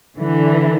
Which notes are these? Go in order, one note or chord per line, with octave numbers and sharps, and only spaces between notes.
D3 E3